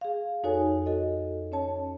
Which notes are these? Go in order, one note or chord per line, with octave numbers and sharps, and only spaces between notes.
G#4 F5
F2 D#4 F#4 A4 C#5 G#5
F#4 A4 D#5
C#4 C#5 A5